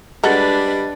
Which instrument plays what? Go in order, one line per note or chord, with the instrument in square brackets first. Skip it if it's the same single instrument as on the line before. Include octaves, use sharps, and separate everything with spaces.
[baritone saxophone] G3 [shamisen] G#3 F#4 A4 [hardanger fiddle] D4 B4 [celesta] D#5 A6